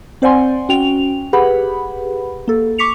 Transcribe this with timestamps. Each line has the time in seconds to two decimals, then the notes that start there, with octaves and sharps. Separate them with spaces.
0.22 C4 C5 D5 F#5 G#5 C6
0.69 C#4 F#4 G5 F7
1.33 G4 G#4 B4 F#5 B5
2.48 A#3 A4
2.78 C#6 D6 B6 C#7 F7